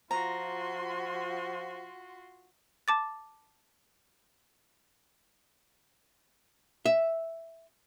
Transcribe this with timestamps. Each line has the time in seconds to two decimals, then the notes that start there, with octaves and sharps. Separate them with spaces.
0.11 F3 F4 F#4 A#5 C6
2.88 A5 D6 A6
6.86 E5